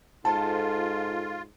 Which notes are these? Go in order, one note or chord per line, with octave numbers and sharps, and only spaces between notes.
G#2 F4 A4 C5 A5